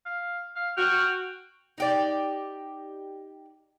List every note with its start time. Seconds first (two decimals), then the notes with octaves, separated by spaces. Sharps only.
0.06 F5
0.56 F5
0.77 F#4 G5 F6
1.78 D#4 G4 D5